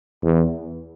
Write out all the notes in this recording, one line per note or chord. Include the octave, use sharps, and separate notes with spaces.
E2